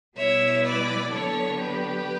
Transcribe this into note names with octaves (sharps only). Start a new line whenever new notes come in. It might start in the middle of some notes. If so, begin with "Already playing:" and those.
B2 G3 B3 E4 C#5 E5
B4 D5
D3 F#3 B3 A4 C#5
G4 B4